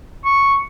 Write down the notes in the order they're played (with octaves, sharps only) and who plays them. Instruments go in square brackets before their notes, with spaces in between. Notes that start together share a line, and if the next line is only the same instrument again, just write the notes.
[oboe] C#6